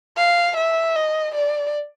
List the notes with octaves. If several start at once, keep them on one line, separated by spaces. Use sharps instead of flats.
F5
E5
D#5
D5